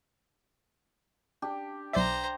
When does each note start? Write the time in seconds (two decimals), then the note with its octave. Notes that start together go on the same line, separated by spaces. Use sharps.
1.42 D4 G4
1.93 B1 C5 D5 E5 A#5